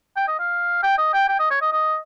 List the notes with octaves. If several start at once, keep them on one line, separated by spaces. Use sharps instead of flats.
G5
D#5
F5
G5
D#5
G5
G5
D#5
C#5
D#5
D#5